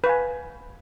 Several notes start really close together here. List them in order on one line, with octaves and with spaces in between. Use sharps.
B4 F5 G#5